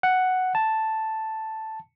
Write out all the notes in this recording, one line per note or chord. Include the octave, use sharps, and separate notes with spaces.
F#5
A5